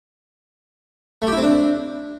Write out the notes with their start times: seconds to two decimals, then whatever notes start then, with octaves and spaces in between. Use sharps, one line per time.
1.22 A3
1.27 G4
1.32 E4
1.37 C4
1.42 D4